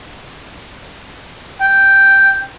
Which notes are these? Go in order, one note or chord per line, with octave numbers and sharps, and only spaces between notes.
G5